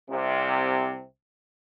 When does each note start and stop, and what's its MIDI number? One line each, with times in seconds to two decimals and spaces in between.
0.10 1.04 36
0.10 1.04 48